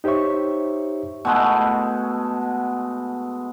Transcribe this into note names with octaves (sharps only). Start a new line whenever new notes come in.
D#4 G4 C5 C#5 E5 C#6
B2 G#3 A3